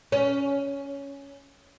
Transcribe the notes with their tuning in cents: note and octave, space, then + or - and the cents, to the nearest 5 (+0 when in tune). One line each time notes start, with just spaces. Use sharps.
C#4 +10